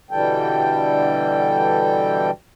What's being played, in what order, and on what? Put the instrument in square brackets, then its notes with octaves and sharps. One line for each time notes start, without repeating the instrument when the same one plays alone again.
[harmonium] B2 D3 E3 G3 A4 G5